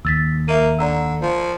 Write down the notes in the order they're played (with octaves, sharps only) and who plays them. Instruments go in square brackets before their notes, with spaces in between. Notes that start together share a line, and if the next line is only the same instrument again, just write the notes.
[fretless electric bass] D#2 [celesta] E6 A6 B6
[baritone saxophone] A#3 [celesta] E5 D#7
[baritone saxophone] D3 [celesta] D5 A#5 E6
[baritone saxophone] F3